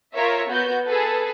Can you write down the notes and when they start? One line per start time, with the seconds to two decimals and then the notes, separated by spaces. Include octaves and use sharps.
0.14 F4 A#4 C#5 E5
0.50 B3 F#4 G6
0.87 G#4 A4 B4